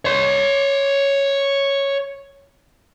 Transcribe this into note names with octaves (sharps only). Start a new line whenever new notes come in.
C#5 C6